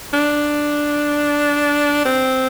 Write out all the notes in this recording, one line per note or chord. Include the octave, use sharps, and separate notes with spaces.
D4
C4